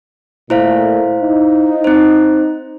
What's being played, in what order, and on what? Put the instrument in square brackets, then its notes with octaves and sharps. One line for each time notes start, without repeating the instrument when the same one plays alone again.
[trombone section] A#2 A3 [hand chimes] E4 C5 F5
[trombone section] D#4
[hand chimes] C4 C5